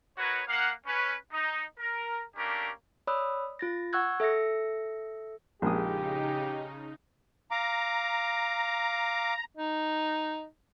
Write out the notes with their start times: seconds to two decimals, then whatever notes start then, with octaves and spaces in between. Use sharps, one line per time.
0.17 D#4 F#4 A#4 B4 C#5
0.48 A#3 F5 F#5
0.86 C#4 B4
1.32 D#4
1.78 A#4
2.36 A3 A#3 C#4 D4 G4 A#4
3.07 C#5 D5 B5 D#6 E6 F#6
3.59 F4 A6 A#6
3.93 F#5 C#6 E6 F#6 G#6
4.20 A4 E5 E6 A#6 C#7
5.62 A#1 C#3 G#3 D#4 G4 D#6
7.51 F5 A#5 D6
9.57 D#4